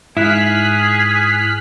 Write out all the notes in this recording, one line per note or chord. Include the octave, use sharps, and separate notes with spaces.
G#2 E4 G#4 F6 F#6 B6